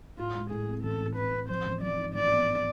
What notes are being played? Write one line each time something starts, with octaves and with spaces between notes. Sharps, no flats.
A2 F4
G#3
A2 G#4
C4
A1 A4
A2
A2 B4
C4
F3 C5
A1
F3 D5
G#2
A1 D5
B3